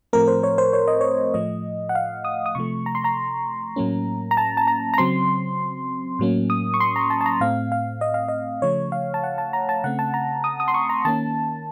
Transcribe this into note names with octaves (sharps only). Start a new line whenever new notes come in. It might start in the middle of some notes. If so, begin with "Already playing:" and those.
A2 F3 A3 C4 A#4
C5
C#5
C5
C#5
D#5
C#5
A2 F3 A3 D#5
F#5
F5
D#6
D#6
C3 F3 A3 C#6
A#5
C6
A#5
A2 F#3 A#3 C#4
A#5
A5
A5
A#5
A#5
C#3 F#3 C4 C6
A2 F#3 A#3 C#4
D#6
C#6
C6
A#5
A5
A5
A#5
A2 A3 C4 F5
F5
D#5
F5
D#5
C#3 F3 A3 C#5
F5
A5
F#5
A5
A#5
A5
C#3 A3 C4 F#5
A5
A#5
D#6
D#6
C6
C#6
A#5
D#3 A#3 C#4 A5